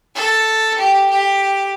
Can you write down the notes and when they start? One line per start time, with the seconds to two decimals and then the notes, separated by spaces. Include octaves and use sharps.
0.15 A4
0.78 G4
1.10 G4